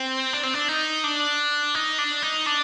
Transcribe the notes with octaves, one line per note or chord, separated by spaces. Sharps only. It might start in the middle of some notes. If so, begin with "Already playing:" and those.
Already playing: C4
D4
C4
D4
D#4
D4
D#4
D4
D#4
D4